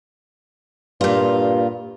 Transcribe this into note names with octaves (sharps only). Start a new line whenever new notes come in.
G2 A#2 F4